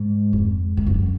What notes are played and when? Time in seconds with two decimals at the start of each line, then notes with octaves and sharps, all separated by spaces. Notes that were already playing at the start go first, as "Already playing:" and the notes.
Already playing: G#2
0.33 F2
0.77 G#2
0.86 F#2